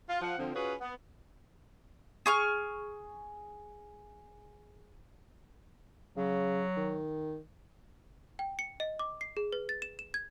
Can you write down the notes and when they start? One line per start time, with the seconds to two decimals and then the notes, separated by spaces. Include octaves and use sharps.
0.09 F4
0.22 F3 F#5
0.38 D3 F3 C4
0.55 C#4 F4 F#4 G#4 B4 C#5
0.81 B3
2.26 G#4 C#6 F6
6.17 C#3 F#3
6.77 D#3
8.39 G5
8.59 C#7
8.80 D#5
8.99 D6
9.21 C7
9.37 G#4
9.53 B4
9.69 A6
9.82 E7
9.99 E7
10.14 G#6